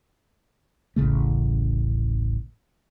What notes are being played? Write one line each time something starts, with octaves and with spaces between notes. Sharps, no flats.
D1 A1 C#3 A3